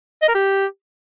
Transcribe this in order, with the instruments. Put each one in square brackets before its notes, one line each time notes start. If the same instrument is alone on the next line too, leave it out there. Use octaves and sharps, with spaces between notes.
[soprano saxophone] D#5
A#4
G4